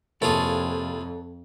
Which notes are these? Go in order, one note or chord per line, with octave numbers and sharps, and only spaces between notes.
F2 C3 A#3 E4 F4 G#4 A4 C#5